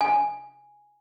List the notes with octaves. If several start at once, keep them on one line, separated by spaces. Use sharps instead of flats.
G#5